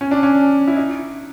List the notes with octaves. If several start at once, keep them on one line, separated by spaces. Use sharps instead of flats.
C#4
D4
C#4
E4
D#4